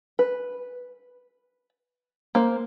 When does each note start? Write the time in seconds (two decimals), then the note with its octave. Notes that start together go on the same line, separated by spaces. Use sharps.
0.19 B4
2.35 A#3 C5